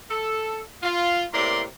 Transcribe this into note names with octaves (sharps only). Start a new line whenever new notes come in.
A4
F4
A2 C3 A#3 A#4 D5 C6